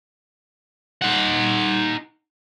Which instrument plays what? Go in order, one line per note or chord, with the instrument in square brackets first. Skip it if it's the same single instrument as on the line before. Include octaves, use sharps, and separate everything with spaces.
[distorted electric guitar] D#4 F#5